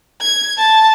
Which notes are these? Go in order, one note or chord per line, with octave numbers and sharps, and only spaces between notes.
G#6
A5